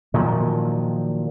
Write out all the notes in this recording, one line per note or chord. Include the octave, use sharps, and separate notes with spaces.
A#2 D#3 F3 F#3